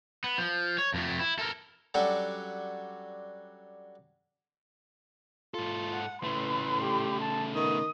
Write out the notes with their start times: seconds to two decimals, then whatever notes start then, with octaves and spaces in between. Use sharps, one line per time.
0.24 B3
0.38 F3
0.79 C#5
0.94 F2 A3
1.19 E4
1.39 A4 A#4
1.94 F#3 G3 C#4 D4 F#4 A4
5.54 G#2 F4 A4
5.92 F#5
6.24 A2 C#3 A3 B4 C6
6.82 G4
7.21 A5
7.55 D#3 B3 D#6